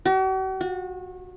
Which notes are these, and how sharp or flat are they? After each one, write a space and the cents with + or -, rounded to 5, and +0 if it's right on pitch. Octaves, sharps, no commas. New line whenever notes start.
F#4 +45
F#4 -30